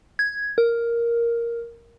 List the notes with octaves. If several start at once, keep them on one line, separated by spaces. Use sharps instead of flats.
G#6
A#4